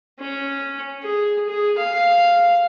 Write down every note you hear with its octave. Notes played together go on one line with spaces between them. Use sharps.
C#4
G#4
G#4
F5